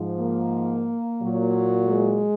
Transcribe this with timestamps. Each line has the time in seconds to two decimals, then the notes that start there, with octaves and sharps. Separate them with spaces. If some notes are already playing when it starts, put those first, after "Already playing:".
Already playing: G#2 F3
0.20 A#3
1.21 A#2 F#3
1.89 G#3